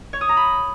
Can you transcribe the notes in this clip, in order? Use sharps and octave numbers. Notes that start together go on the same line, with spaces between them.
C#5
D#6
A#5
B5